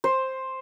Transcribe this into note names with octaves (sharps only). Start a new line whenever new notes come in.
C5